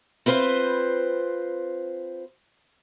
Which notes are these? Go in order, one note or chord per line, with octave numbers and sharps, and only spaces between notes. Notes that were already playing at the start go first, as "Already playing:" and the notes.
C4 F4 B4 C5